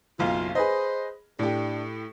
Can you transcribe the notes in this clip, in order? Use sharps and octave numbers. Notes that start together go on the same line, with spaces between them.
F#1 B1 F4 F5
G#4 B4 C5 D#5
A2 D4 G4